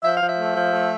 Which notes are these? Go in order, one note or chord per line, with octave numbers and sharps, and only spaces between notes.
F3 E5
F5
F3
E5
A3
F3
A3